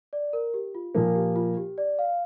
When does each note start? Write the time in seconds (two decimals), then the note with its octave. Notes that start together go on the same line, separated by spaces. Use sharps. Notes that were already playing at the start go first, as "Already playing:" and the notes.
0.13 D5
0.33 A#4
0.54 G4
0.75 F4
0.95 A#2 F3 A#3 A#4
1.15 G4
1.36 F4
1.57 G4
1.78 D5
1.99 F5